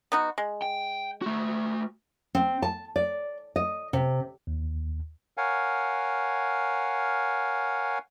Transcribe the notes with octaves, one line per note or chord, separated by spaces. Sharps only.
B3 D#4 F#4
G#3
G5
A3 F#4
C4
A5
D5
D#5
C3
D#2
A#4 C#5 F5 F#5 G#5